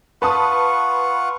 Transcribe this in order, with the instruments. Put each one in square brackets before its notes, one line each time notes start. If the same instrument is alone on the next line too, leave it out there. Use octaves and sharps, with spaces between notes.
[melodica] F4 F#5 C#6 [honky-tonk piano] B4 A5 D#6